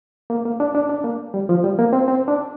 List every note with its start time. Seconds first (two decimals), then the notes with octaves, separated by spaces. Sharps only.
0.30 A#3
0.45 A#3
0.60 D4
0.75 D4
0.89 D4
1.04 A#3
1.34 G3
1.49 F3
1.64 G3
1.79 A#3
1.93 C4
2.08 C4
2.28 D4